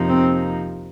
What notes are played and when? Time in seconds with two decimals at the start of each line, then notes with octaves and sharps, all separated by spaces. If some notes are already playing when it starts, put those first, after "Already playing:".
Already playing: F2 C3 F3 A#3 D#4
0.09 C4